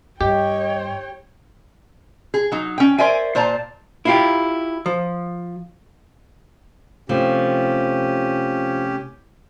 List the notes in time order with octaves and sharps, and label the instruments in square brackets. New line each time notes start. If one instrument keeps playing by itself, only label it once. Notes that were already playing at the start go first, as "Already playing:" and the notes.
[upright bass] G2 [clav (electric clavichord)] G4 [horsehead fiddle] C#5 G5 [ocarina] D#5
[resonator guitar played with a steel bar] G#4
F#3 D#4
C#4 G5
A#4 C5 D5 E5 G#5
A#2 C5 D5 A5 A#5
[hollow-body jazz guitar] E4 F4 G4
F3
[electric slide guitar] C3 A3 [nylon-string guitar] F3 [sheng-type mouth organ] C#4 G4